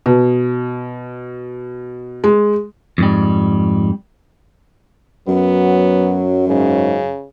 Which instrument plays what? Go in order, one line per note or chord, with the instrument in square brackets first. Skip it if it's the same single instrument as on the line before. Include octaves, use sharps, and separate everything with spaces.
[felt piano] B2
G#3
[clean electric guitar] F2 G#2 G3
[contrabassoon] F#2 [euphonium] F#3 [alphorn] B3
[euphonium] G#2 [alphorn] C#3